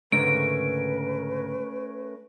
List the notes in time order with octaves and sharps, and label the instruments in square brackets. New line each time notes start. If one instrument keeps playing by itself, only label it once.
[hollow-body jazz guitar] C#2 G#2 D3 [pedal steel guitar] A3 C#4 A#4 [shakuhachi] B4 [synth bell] D7